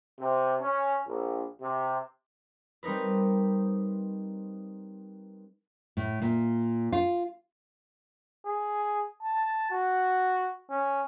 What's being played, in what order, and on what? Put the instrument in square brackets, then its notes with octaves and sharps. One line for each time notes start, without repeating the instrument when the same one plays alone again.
[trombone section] C3
C#4
A#1
C3
[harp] G3 C4 D#4 A#4 B4
[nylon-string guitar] A2
A#2
F4
[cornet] G#4
A5
F#4
C#4